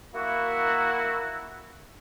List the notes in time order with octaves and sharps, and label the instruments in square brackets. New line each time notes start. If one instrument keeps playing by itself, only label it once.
[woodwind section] A#3 E4 F#4